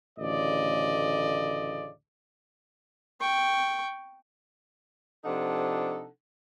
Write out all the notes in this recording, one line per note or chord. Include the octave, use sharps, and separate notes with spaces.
A1 D2 C#3 D5 D#5
G5 C#6
C3 F3 D4 D#4 A4 F#5